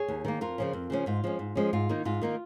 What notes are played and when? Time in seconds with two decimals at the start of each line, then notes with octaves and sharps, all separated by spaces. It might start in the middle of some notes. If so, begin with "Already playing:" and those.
Already playing: G#4 C#5
0.08 D#2
0.25 D#3 A#3
0.41 F2 F4 A#4
0.58 C#3 F3 C#4
0.73 F2
0.90 C#3 F3 C#4
1.06 G#2 F4
1.24 F3 G#3 C#4
1.39 G#2
1.55 F3 G#3 C#4
1.73 G#2 F4
1.89 D#3 A#3 D#4
2.05 G#2 F4
2.22 D#3 A#3 D#4